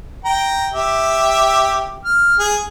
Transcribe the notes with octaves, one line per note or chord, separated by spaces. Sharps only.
G5 A#5
G4 E5
F6
G#4